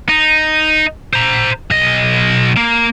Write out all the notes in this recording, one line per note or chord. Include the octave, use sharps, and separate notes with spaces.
D#4
C5 A#5
B1 D#5
A#3